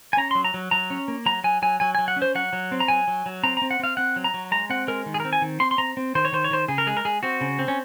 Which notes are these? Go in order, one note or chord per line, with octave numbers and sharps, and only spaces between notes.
G#5
C#4 A#5
F#3 C6
A#5
F#3
F#3 A#5
C#4
A#3
F#3 A#5
F#3 G#5
F#3 G#5
F#3 G#5
F#3 G#5
F#5
C#4
C5
F#3 F#5
F#3
C4
A#5
F#3 G#5
F#3
F#3
C4 A#5
A#5
C4
F#5
C4 F5
C4 F#5
F#3
A#5
F#3
G#3 A#5
C4 F#5
G#3 A#4
D#3
G#4
A#4
C4
G#5
D#3
C4 C6
C6
C4 A#5
C4
D#3 C5
C#5
D#3 C5
C#5
D#3 C5
C#3 G#4
A#4
G#3 G#4
A#4
G#3 G#4
C4 F#4
C#3
C4
C#4